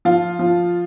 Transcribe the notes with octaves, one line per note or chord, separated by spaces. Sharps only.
F3 F4
F3